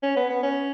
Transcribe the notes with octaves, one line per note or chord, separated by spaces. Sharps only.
C#4
B3
B3
C#4